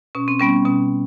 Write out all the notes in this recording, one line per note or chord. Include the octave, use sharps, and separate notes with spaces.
B2 C#4
C4
G3 B3 C#4
B2 C#4